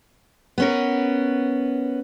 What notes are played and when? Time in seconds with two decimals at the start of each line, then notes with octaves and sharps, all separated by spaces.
0.58 B3 C#4 A#4